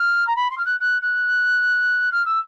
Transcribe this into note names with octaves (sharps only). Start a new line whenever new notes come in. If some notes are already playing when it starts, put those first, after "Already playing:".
Already playing: F6
A#5
B5
C6
F6
F#6
F#6
F#6
F6
E6